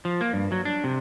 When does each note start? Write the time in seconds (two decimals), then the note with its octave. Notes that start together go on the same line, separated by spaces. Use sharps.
0.05 F3
0.21 A#3
0.33 G2
0.52 F#3
0.65 D4
0.84 C3